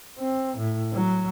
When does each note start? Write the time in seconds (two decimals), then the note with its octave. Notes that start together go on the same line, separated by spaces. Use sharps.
0.19 C4
0.57 A2
0.93 F#3